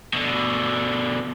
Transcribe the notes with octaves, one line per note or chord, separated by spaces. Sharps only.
B2 D3